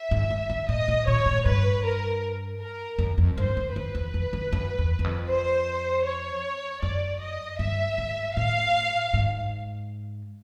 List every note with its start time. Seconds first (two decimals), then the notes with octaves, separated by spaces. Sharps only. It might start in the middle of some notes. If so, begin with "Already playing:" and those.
Already playing: E5
0.11 G#2
0.30 G#2
0.50 G2
0.69 A2 D#5
0.88 A#2
1.07 A#2 C#5
1.26 A2
1.46 G2 B4
1.84 A#4
2.61 A#4
2.99 F#2
3.18 F2
3.38 G2 C5
3.57 F#2
3.76 F2 B4
3.95 E2
4.14 F2
4.33 F#2
4.53 F#2
4.78 E2
4.99 E2
5.04 F2
5.29 C5
6.06 C#5
6.83 F#2 D5
7.21 D#5
7.59 G2 E5
7.98 G#2
8.36 A2 F5
9.14 G#2